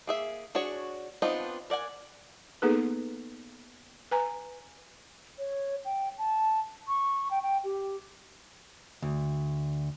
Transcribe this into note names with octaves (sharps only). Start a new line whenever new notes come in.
A#3 G#4 E5
D4 F#4 G#4 C#5
B3 C4 D4 D#4 F4
A#4 D5 F#5 G#5
A#3 B3 D#4 G#4 A4 B4
B4 G#5 A#5
C#5
G5
A5
C#6
G5
G5
G4
D2